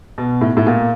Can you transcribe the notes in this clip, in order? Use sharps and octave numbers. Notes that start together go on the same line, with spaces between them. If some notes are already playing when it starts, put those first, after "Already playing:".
B2
A2
A2
A#2